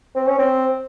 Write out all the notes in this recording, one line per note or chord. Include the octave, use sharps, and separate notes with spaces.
C4
C#4
C4